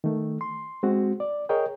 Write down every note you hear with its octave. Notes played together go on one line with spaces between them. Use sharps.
D#3 A3
C6
G#3 C4 F#4
D5
G#4 A#4 C#5 D#5 G5